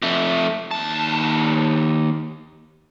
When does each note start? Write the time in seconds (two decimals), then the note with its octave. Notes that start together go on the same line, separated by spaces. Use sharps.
0.02 F2 A3
0.71 D#2 A5